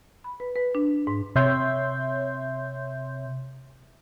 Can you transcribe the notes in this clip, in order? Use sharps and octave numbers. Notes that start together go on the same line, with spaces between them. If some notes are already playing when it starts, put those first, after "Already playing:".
B5
B4
B4
D4
G#2
C3 C#5 E5 C6 G6